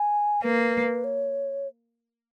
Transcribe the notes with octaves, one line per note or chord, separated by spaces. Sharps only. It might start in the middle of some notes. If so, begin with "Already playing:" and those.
Already playing: G#5
A#3 B4
C#5